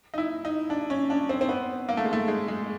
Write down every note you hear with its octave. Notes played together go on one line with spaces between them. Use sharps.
D#4
E4
D#4
D4
C#4
D4
C4
C4
B3
A#3
A3
G#3
A3
G#3
G#3